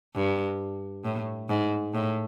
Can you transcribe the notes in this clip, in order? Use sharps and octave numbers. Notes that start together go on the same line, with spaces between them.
G2
A2
G#2
A2